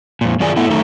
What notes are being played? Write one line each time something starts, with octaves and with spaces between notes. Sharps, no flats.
F2 A#2
F#2 D#3 F4 G#4 D5 G#5
A3 B3 E4
F#2 D#3 A3 D#4 A4 A#5